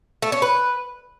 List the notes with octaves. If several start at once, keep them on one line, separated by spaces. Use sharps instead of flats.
A3
C#4
B4